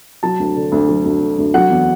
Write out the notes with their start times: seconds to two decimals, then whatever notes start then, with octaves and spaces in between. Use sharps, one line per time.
0.23 F#3 A5
0.39 D2
0.56 D3
0.72 D2
0.89 F#3
1.05 D2
1.21 D3
1.38 D2
1.54 F#3 F#5
1.70 E2